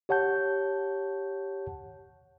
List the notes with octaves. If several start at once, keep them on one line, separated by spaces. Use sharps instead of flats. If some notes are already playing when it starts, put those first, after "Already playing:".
G4 C#5 F#5 A5 G6